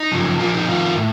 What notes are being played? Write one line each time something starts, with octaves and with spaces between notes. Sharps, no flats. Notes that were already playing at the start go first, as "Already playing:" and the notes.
Already playing: D#4
F#2 C#3 F3
A#2 F3 F4
D#4
F2 D#3 F4
A2